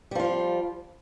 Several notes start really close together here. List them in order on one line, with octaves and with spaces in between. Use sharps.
G3 F3 F4